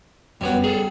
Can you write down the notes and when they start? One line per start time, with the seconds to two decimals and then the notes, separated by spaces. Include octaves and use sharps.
0.41 F#2 G3 B3 C#5
0.64 G3 G#4 A4